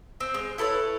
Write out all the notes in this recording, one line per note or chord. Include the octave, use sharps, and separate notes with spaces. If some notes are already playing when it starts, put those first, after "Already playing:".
C4
G#3
E4 A4 B4 C#5